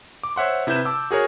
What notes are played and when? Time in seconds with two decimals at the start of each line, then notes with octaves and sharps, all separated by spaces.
0.24 D6
0.36 C5 C#5 E5 F#5 C6
0.67 C3 E4 B4 G6 E7
0.85 A5 D6 E6
1.11 F#4 G#4 A#4 C#5